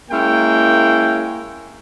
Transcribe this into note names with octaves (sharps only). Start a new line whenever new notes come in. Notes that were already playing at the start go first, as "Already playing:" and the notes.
G#3 A#3 C#4 E4 G5